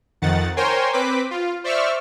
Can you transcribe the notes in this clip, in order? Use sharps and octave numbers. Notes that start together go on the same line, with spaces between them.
F2 D#3 F#5 A6
A#4 C5 C#5 G5 G#5 C6
C4 B4 D6 B6
F4
C5 D5 E5 C#6 E6 F6